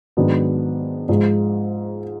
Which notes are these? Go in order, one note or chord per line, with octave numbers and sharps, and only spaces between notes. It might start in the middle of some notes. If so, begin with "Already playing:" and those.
G#2 D#3 F#3 B3 D4
G#2 F3 G#3